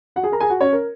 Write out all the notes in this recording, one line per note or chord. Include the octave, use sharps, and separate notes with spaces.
F#4 F#5
G#4 G#5
A#4 A#5
G#4 G#5
F#4 F#5
C#4 C#5
A#4